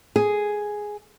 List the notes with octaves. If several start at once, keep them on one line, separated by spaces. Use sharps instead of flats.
G#4